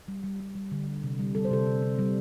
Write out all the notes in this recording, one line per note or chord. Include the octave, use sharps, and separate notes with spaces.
G3
G3
G3
G3
D3
G3
C3
G3
G3 A4
C5
C3 A4
C3
C3
G3